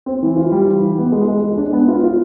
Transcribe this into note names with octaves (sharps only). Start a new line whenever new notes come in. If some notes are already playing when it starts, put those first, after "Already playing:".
C4
E3
F4
G3
E3
E3
B3
G#3
G#3
G#3
D4
B3
F4
F4